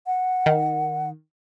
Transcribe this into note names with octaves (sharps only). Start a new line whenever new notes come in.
F#5
D#3